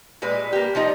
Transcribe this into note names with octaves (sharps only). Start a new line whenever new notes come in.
A#2 G3 G#3 B4
A#3 G4
F3 G3 D#4 D#5